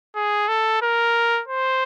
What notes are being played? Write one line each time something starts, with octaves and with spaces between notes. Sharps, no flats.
G#4
A4
A#4
C5